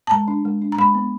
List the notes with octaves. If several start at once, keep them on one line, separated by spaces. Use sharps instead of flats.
A5
G#3 A#5
D4
G#3
D4
A#5
G#3 B5
B3